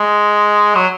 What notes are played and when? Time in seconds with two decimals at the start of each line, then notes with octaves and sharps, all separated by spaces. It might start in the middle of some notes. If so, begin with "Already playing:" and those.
Already playing: G#3
0.75 F#3